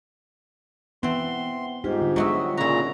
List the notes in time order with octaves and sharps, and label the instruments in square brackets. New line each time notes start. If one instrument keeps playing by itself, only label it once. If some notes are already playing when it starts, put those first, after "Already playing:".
[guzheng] E3 C4 [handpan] B3 [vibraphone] E5 F#5 G5 [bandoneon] C6
[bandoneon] G#2 [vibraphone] G3 F4 G5 [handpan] D#4 G4
[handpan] D3
[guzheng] F#3 B3 F#4 [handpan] G#3 D#5 E5
[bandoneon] A#2 C#3 A#5 [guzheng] E4 F#4